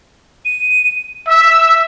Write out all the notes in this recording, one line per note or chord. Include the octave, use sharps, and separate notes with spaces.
D#7
E5 E6